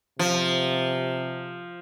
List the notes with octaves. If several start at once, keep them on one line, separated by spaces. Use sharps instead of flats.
C3 F3